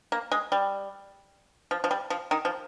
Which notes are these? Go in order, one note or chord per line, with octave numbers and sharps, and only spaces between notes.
A#3
G#3
G3
F3
F3
G3
F3
D#3
F3